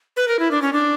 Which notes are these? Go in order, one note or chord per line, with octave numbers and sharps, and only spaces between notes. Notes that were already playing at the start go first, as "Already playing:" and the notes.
B4
A#4
E4
D4
C#4
D4